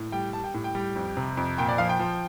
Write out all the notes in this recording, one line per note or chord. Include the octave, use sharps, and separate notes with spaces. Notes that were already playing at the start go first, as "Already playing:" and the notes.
Already playing: A2
G3 G5
G3 A5
G5
A2
G5
G3
F2
C3
F2
A#2 G5
D5
F3 F5
G5
F3